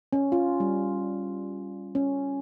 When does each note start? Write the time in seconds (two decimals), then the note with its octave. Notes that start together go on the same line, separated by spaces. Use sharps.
0.13 C#4
0.32 F4
0.60 G3
1.95 C#4